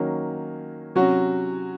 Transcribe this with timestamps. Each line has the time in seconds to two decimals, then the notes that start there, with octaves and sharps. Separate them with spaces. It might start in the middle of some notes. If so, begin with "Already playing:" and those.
Already playing: D#3 F#3 A#3 C#4
0.95 C3 F#3 C#4 F#4